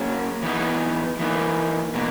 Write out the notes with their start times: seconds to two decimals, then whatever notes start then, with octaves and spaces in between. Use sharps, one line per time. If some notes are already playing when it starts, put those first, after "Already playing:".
Already playing: F#3 A#3 C#4 G#4
0.43 E3 B3 D#4
1.19 E3 A#3 D#4
1.94 B2 A#3